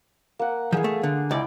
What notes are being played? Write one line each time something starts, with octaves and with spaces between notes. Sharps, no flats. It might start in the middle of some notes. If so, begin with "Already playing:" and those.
A#3 F#5
E3 F3 G#4 F5
A3
D3
C#2 E4 D5 G5